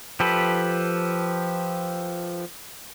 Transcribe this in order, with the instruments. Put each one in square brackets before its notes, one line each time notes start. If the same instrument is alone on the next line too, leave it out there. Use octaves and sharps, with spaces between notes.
[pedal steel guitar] F3 G4 A4 B4